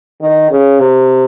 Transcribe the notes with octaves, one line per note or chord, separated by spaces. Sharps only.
D#3
C#3
C3